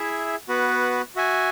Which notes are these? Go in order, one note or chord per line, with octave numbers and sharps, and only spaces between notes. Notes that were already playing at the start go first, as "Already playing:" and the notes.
Already playing: E4 G#4 E5
B3 F#4 B4
F#4 E5 G#5